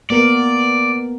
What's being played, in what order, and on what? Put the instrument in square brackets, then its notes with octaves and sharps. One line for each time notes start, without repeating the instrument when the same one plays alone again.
[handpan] A#3 B3 A#4 [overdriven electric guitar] D5